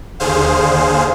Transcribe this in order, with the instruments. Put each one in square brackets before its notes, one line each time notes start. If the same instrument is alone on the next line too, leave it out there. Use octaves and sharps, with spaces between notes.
[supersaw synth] D#2 D3 G#4 C5 F5